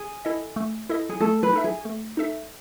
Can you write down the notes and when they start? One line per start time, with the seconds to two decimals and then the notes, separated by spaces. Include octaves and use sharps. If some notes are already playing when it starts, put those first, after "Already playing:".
Already playing: G#4
0.25 E4 A4 D#5
0.56 A3
0.89 E4 A4 D#5
1.09 G#4
1.20 A3 A4
1.43 B4
1.53 D#4 A4 E5
1.64 G#4
1.85 A3
2.17 D#4 A4 E5